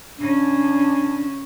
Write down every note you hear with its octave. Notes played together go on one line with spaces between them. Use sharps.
C#3 C#4 D4